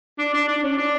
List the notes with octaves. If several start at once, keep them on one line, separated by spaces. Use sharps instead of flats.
D4
D4
D4
C#4
D4